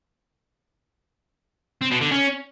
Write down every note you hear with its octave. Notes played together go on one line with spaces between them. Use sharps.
C4
B2
D3
C#4